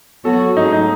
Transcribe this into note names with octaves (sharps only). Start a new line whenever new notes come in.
F#3 B3 F#4 A4 C#5
G#2 F#3 A3 C#4 D#4 G#4
D#4